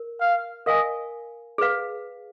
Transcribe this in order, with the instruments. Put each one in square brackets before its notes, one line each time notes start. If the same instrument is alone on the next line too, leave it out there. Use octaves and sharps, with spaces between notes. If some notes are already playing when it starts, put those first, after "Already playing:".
Already playing: [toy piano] A#4
[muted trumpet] F5
[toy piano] A#4 F5 G#5 [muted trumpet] D#5
[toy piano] G#4 B4 F5